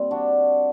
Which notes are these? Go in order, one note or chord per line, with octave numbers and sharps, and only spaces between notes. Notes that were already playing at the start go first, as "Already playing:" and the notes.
Already playing: A#2 G3 C4
D4 F#4